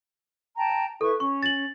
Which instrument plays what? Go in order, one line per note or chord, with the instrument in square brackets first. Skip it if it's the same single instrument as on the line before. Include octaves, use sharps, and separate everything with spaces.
[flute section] G5 A5 A#5
[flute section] E4 B4 C#6 [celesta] A4
[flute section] C#4 [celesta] C#6
[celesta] A6 F#7